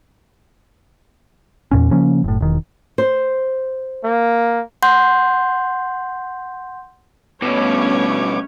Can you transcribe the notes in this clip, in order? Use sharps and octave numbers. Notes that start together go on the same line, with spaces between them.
E2 A#2 C#4
C#3 F3 A#3 C#4
F#1 A2
E1 D#3
C5
A#3
F#5 C6 G6
G2 B2 A3 B3 C#4 C#5 D6